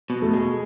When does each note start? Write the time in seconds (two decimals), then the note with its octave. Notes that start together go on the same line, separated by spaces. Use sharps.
0.10 B2
0.22 A3
0.33 G#3